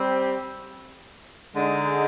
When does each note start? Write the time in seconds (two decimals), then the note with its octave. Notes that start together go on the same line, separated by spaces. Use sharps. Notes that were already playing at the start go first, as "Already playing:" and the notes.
Already playing: G3 C4 G4
1.55 D3 G#3 D#4